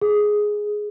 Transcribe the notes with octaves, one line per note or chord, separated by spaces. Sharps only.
G#4